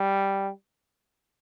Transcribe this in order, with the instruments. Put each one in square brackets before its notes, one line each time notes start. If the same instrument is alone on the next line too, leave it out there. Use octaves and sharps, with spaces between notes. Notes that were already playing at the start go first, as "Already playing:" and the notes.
Already playing: [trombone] G3